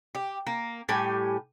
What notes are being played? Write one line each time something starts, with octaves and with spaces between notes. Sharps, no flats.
G4
A#3
A2 G3 G4 G#5